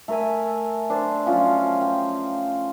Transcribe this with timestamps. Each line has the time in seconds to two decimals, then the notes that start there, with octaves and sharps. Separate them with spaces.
0.08 A3 A#4 E5 G#5
0.90 D4 C5 A5
1.26 F3 F#3 C#4 F4
1.81 G5